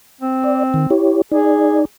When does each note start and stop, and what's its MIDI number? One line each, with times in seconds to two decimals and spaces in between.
0.21 0.89 60
0.44 0.63 74
0.74 0.86 51
0.90 1.22 64
0.90 1.22 67
0.90 1.22 73
1.32 1.85 63
1.32 1.79 68
1.32 1.85 74